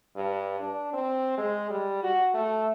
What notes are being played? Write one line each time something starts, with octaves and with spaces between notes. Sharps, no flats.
G2
D4
C4
G#3
G3
F#4
A3